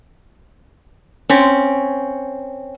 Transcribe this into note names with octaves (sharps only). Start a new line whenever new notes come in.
C4 C#4